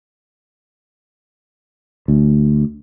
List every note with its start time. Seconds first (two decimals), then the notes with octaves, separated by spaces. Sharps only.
2.08 D2